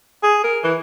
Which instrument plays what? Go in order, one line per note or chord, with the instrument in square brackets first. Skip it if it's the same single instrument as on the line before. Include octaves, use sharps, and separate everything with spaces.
[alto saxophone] G#4
A#4
E3